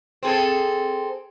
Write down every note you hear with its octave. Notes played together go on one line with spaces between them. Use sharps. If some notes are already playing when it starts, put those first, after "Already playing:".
C4 G#4 A4